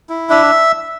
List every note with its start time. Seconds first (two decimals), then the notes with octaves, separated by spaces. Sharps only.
0.09 E4
0.30 D4 E5